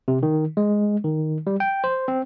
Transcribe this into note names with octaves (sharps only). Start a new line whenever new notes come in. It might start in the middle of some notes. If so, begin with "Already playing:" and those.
C3
D#3
G#3
D#3
G3
G5
C5
C4